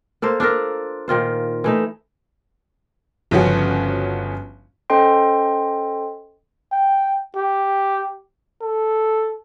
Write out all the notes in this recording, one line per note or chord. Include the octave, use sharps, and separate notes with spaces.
A#3 A4 A#4 C5
D4 F4 A4 A#4
A#2 D#3 F4 C5
E3 A3 D#4
G1 C#3 F3 C#4 F#4
C#4 A4 C5 D#5 G5 C6
G5
G4
A4